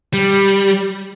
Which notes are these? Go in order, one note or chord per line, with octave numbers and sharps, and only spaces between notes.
G3